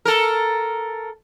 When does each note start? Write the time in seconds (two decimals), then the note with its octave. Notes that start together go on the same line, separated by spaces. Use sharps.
0.05 A4 A#4